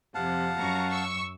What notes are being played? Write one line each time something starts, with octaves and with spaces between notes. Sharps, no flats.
F2 C3 F5 F#5 A5
F#2 A#5 C#6
C#6 E6